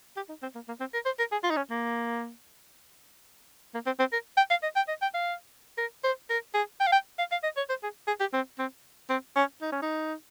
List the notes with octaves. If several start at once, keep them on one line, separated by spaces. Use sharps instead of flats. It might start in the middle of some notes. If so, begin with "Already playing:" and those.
G4
D#4
C4
A#3
A#3
C4
A#4
C5
A#4
G#4
F4
D#4
C#4
A#3
A#3
C4
C4
A#4
G5
F5
D#5
G5
D#5
G5
F5
A#4
C5
A#4
G#4
G5
F5
G5
F5
F5
D#5
C#5
C5
G#4
G#4
G4
C4
C4
C4
C#4
D#4
C#4
D#4